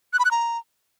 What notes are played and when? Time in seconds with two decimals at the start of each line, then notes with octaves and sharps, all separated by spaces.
0.13 F#6
0.19 B5
0.25 F#6
0.31 A#5